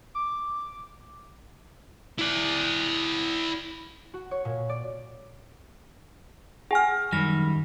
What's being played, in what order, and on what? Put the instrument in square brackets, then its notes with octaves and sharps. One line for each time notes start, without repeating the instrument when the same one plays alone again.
[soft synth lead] D6
[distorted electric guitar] E4 D5
[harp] F#4
C#5
A#2
D5
[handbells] G#4 F6 [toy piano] F#5 G#5
[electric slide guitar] F#2 G3 [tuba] D#3 [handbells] A#6